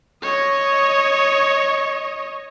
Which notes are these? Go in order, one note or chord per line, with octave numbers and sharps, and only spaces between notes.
C#5 D#5